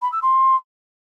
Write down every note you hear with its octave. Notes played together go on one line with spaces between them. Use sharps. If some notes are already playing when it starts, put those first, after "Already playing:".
B5
E6
C6